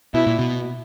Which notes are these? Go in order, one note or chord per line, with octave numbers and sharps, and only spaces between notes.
B2 E4
A#2
B2